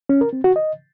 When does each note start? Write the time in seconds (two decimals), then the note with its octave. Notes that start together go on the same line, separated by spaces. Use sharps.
0.09 C#4
0.21 A#4
0.33 C4
0.44 F#4
0.56 D#5